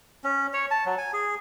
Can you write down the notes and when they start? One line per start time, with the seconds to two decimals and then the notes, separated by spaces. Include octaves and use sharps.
0.24 C#4
0.53 C#5
0.71 A5
0.86 F#3
0.98 G#5
1.13 G#4